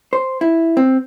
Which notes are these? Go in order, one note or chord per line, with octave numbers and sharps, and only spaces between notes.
C5
E4
C4